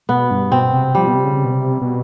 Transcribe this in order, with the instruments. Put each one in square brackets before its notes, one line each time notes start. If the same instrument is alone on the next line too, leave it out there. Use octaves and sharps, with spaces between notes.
[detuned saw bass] B2 [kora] B3
[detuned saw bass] G2
[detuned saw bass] B2 [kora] C4
[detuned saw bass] C3
[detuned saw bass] F3 [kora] G3
[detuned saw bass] B2
C3
C#3
B2
C3
B2